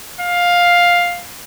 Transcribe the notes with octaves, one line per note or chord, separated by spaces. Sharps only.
F5